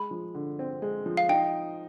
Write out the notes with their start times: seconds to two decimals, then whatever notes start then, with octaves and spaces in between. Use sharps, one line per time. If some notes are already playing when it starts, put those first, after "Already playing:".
Already playing: G#3 B5
0.11 F3
0.34 D3
0.59 C4
0.82 G#3
1.06 F3
1.17 F5
1.29 D#4 G5